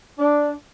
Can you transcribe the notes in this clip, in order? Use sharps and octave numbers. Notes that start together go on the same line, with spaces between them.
D4